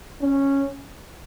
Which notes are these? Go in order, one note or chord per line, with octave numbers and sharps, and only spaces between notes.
C#4